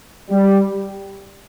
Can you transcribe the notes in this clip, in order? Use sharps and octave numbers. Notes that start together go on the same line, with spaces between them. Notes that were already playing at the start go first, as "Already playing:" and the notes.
G3